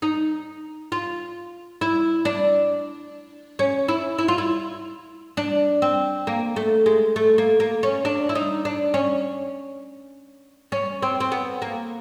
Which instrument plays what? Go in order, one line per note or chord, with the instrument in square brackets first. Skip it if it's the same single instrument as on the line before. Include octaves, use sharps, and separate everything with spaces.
[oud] D#4
F4
E4
D4
C#4
E4
E4
F4
E4
D4
C4
A#3
A3
G#3
A3
A#3
A#3
C#4
D4
E4
D#4
D4
C#4
C#4
C4
C4
B3
A#3